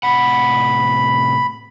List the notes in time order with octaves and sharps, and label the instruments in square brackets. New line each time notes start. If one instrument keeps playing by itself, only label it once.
[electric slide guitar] A2 C3 F#5 [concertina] B5